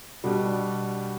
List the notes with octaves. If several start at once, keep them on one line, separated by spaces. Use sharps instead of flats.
B2 G3 D4